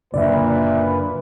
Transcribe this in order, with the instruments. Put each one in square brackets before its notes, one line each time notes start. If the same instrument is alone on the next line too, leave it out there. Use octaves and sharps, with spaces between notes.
[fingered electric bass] F#1 D3 F#3 [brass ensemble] A#2 [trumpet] B4 [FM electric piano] D5 E5